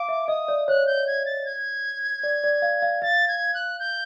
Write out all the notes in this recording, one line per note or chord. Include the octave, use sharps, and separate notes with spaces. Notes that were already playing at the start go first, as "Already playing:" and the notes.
Already playing: F5 D6
E5
D#5 D#6
D5
C#5 F#6
G6
G#6
A6
G#6
D5
D5
F5
F5
F5 A6
G#6
F#6
G6